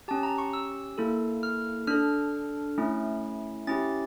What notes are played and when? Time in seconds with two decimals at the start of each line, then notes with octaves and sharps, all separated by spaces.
0.08 C#4 G4 A5
0.23 A#5
0.38 C#6
0.53 E6
0.98 A#3 E4 A4
1.43 F6
1.87 D4 A4 F6
2.78 A3 C#4 E4
3.67 C#4 E4 G4 A6